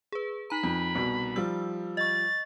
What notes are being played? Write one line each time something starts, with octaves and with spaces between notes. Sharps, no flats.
G#4 B4
D#4 A#5 B5
F2
C2 B2
F3 G3 E6
D#5 C#6 A6